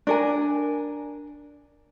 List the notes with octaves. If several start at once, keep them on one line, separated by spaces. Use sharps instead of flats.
D4 A#4 G#5